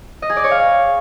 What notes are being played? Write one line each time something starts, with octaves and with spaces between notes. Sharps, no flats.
D#5
G#4
D5
C#5
F5